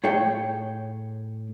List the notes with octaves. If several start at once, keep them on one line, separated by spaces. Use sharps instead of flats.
A2 G#4 C#5 G5